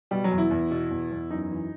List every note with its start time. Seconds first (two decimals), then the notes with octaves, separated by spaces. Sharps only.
0.11 B2 G3
0.24 F#3
0.32 E2
0.38 E4
0.51 E2
0.71 B2
0.91 E2
1.11 E2
1.30 F#2 D#4
1.51 E3